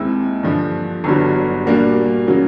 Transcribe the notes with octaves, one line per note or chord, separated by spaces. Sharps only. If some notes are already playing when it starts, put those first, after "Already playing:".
Already playing: D#2 D#3 G#3 C4 E4
G2 D3 F3
G1 G2 D3 F#3
A#2 G3 A#3 D4 F#4
C#3 F#3 A#3